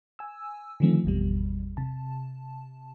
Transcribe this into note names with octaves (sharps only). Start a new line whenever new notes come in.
G#5 E6
D3 D#3 F3 A3 C4
G#1 E2 B2 G3
C3 A5